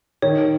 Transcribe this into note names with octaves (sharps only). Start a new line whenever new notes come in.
D#3 C#5